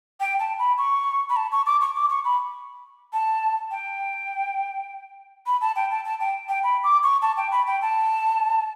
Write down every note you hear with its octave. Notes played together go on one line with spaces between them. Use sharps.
G5
A5
B5
C#6
B5
A5
C#6
D6
C#6
D6
C#6
B5
A5
G5
B5
A5
G5
A5
A5
G5
G5
B5
D6
C#6
A5
G5
B5
G5
A5